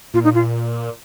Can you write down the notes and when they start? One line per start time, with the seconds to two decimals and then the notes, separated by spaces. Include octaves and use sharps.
0.14 A#2 F4
0.24 D#4
0.35 F4